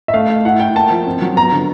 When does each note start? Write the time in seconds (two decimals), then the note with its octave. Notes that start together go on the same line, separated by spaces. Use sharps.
0.08 E5
0.14 A3 F5
0.30 A3
0.45 E4 F#5
0.60 E4 G5
0.75 A#3 A5
0.90 F3
1.06 C4
1.22 F#3
1.36 B3 A#5
1.52 D3